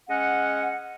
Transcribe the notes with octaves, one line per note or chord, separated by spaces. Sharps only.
G#3 C#4 D#5 F#5